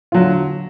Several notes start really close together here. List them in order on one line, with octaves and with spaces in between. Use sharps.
F4 F#3 D3